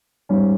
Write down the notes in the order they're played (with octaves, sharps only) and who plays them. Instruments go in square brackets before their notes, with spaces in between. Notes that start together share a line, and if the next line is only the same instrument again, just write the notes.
[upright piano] G#2 G3 C#4